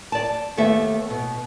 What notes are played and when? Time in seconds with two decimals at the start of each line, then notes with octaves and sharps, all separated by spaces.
0.12 D5 A5
0.57 D#2 A3 B3 A4 E5
1.10 B2